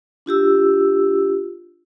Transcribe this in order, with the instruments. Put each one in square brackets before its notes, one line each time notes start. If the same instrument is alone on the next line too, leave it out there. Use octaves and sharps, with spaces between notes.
[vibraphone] D4 F4 G4 E6